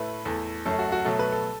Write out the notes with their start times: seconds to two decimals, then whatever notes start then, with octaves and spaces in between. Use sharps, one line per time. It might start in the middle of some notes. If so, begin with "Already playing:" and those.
Already playing: A2 A3 B4
0.25 E2 E3 A3 A4
0.65 F#2 F#3 A3 A4
0.79 F#4
0.92 F#4
1.05 B2 F#3 A3 A4
1.19 B4
1.32 A4